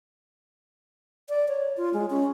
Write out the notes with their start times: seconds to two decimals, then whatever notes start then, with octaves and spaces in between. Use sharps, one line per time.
1.29 D5
1.48 C#5
1.77 F4
1.94 G#3
2.10 C#4